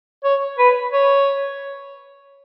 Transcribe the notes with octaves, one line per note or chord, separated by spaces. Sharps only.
C#5
B4
C#5